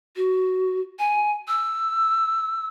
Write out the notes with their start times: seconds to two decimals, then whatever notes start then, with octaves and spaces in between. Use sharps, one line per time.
0.16 F#4
0.99 G#5
1.48 E6